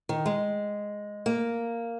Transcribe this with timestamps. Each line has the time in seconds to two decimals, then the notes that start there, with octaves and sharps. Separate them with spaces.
0.09 D#3
0.26 G#3
1.26 A#3